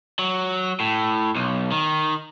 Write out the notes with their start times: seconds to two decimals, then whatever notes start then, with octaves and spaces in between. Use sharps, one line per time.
0.19 F#3
0.80 A2
1.36 B1
1.72 D#3